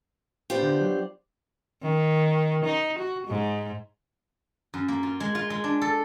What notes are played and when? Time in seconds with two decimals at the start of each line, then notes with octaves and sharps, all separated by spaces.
0.50 B3 D4 F4 G4 C5 D5
0.62 D3
0.81 F#3
1.82 D#3
2.65 D#4
2.99 F#4
3.27 G#2
4.74 F#2
4.88 A#3
5.03 F4
5.20 G#3
5.35 F4
5.50 G#3
5.64 D4
5.81 A4